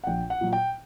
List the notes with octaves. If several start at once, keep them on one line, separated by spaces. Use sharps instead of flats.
F#5
A#1 G5
F#5
A#2 F#3
G5